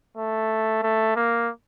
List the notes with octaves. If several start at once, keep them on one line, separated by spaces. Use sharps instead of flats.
A3
A3
A#3